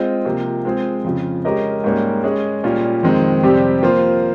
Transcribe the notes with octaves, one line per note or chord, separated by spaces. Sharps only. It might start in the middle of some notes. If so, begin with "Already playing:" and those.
Already playing: G#3 C4 F4 C5 D#5
C3 F3 A#3
G#3 C4 F4 G#4 C5
F2 C#3 F3
G#3 C#4 G4 A#4 D#5
G#2 G3 A#3 C#4
G#3 C#4 G#4 D#5
A#2 G3 C#4 F4
F2 D#3 G#3 C4 D#4
F2 C3 G3 C4 G4
F3 A#3 F4 C5